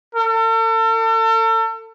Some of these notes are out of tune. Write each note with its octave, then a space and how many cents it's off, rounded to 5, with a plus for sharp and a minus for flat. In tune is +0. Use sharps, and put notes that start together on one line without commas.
A4 +40